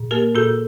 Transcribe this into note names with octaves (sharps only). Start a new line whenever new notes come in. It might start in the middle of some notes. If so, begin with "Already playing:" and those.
Already playing: A#2
A#3 G4 A#4
A#2 F#4 A4